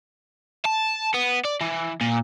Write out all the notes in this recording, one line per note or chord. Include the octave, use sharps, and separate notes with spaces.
A5
B3
D5
E3
A#2